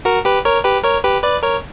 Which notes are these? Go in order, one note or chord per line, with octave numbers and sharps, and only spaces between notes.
F#4 A#4
G4 B4
A#4 C#5
G4 B4
A#4 C#5
G4 B4
B4 D5
A#4 C#5